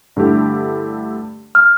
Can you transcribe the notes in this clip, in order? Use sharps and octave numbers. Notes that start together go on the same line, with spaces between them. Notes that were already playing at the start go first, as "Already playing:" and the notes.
G2 D3 A3 E4 G4
F6